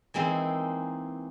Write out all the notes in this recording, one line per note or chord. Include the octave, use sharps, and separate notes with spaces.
E3 G#3 A#3 C4 D#4 E4